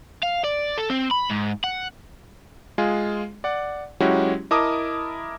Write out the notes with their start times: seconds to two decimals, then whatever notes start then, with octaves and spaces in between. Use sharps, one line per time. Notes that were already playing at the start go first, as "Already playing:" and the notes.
0.23 F5
0.44 D5
0.78 A4
0.90 C4
1.11 B5
1.30 G#2
1.64 F#5
2.78 G#3 F4 G#4
3.44 D5 F#5
4.00 F#3 G#3 C#4 E4 F#4 G4
4.51 E4 A#4 D#5 A5 D6 D#6